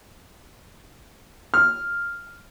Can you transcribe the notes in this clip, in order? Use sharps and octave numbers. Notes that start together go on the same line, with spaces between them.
F6